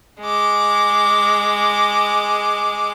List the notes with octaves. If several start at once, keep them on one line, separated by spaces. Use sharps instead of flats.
G#3 D6